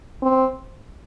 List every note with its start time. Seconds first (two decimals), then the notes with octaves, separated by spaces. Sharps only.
0.23 C4